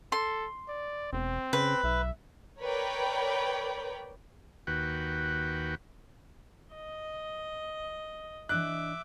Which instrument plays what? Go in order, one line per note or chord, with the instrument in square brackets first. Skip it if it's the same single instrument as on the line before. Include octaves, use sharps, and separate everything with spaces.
[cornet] A4 [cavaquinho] C6
[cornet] D5
[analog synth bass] E1 [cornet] C4
[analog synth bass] C#3 [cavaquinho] B4
[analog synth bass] B1 [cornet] E5
[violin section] A#4 B4 C#5 D5 G5 B5
[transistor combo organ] D#2 F#4 B4 G5
[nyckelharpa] D#5
[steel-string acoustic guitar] E3 D4 D#5 [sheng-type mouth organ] E5 D6 [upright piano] F#6